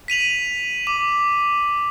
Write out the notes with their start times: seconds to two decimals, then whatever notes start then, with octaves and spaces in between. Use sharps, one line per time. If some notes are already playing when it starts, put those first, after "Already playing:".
0.08 B6 D#7 F7 F#7
0.87 D6